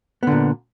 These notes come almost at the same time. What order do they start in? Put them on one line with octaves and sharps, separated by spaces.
B3 D3 A#2